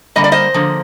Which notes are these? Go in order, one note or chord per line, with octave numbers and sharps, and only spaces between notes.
D3 G3 A#3 D#5
D5
C5 D#5
D3 F3 A#3